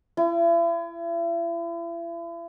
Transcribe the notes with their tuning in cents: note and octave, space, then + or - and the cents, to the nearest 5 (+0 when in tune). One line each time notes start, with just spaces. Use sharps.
E4 +40